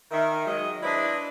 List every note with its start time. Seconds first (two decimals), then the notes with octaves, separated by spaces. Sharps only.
0.11 D#3 E5
0.47 F#3 G#3 D#5
0.83 D4 E4 B4 C5 D5 D#5